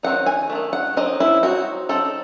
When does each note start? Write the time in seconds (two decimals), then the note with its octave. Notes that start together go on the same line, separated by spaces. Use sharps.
0.03 D#3 F#3 C4 D#4 F#5
0.26 G#5
0.50 F#3 A3
0.55 D#3
0.73 F#5
0.97 F#3 C4 D#4 D#5
1.20 E4
1.43 F#3 C4 D#4 F#4
1.89 F#3 C4 D#4 A4